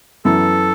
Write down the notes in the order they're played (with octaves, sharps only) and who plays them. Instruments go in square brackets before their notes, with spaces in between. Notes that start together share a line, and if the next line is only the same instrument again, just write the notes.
[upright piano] F#2 E3 B3 E4 [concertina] A4